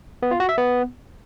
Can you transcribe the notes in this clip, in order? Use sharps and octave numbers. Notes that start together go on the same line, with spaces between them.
B3
F4
F#4
E5
B3